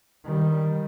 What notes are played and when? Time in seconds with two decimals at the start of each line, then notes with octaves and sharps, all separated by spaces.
0.24 D#3 G3